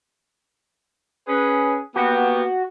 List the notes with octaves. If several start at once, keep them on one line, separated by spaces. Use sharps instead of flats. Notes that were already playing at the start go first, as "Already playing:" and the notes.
C#4 G#4 B4
A#3 B3 F#4 G4